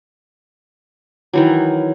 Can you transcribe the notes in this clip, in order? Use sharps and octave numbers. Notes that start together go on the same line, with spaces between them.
D#3 E3 F#3